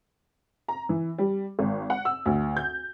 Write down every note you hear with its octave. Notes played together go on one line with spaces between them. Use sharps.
A#5
E3
G3
G#1
F#5
E6
D2
G6